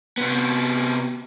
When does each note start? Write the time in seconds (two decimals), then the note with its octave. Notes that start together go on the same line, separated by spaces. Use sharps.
0.17 C3 B3